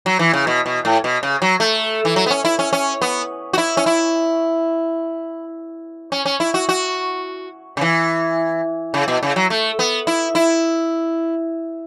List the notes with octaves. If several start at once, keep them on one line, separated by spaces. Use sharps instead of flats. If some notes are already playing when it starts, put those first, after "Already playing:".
F#3
E3
C#3
B2
B2
A2
B2
C#3
F#3
A3
E3
F#3
B3
C#4
E4
C#4
C#4
B3
F#4
E4
C#4
E4
C#4
C#4
E4
F#4
F#4
C#3
E3
C#3
B2
C#3
F#3
A3
B3
E4
E4